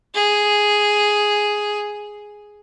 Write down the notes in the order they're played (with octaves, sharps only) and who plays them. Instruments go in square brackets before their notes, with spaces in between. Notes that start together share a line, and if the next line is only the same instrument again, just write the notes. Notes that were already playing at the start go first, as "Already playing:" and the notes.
[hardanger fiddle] G#4